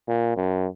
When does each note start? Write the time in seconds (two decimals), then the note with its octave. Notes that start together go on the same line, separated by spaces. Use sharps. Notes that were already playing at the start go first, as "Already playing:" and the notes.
0.08 A#2
0.37 F#2